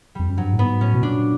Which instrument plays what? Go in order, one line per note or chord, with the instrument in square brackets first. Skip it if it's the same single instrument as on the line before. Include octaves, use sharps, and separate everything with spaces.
[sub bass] F2 [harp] G3
[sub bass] F#2
[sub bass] G2 [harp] F#3
[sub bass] A2
[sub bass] G#2 [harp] B3
[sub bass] A2 [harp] C#4
[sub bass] B2
[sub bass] A#2 [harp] D4